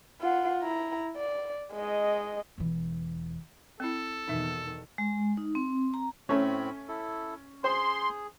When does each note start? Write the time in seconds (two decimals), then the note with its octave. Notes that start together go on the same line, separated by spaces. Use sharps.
0.21 F4 F#5
0.62 E4 A#5
1.16 D5
1.73 G#3 D#5
2.58 E1 E3
3.80 C4 E4 A4
4.28 E2 B2 D#3 D#4 E5
4.98 G#3
5.37 D#4
5.55 C4
5.94 A#5
6.29 A2 A3 C4 C#4 C#5 B5
6.88 E4 A4
7.64 G#4 C5 C6